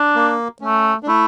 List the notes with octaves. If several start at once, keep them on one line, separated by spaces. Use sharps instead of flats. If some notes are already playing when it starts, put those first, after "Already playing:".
Already playing: D4
A#3
A3 C#4
D4
A3 E4